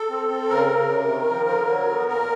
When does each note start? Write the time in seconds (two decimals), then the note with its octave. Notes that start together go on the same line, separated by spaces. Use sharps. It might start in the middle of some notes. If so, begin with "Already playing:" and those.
Already playing: A4
0.10 C4
0.29 C4
0.49 C#3 A#4
0.69 C#3
0.89 C3
1.09 D#3
1.29 F3
1.49 D3
1.68 F#3
1.89 B3
2.08 A#2 A#4